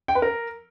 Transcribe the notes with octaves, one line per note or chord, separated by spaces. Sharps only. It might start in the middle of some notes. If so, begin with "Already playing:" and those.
G5
B4
A#4